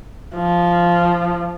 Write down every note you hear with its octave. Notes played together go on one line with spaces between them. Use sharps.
F3